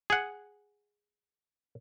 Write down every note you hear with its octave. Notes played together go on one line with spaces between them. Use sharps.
G#4 F#5